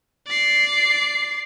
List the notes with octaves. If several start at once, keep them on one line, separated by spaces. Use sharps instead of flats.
D5 C7